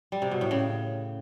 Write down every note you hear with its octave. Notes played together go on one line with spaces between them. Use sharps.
G3
C3
B2
A2
C#3